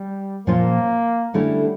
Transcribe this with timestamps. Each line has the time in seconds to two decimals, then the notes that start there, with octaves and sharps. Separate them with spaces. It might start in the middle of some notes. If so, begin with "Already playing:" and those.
Already playing: G3
0.47 A#2 F3 A#3 C#4 F4
1.34 D3 G3 A3 C#4 E4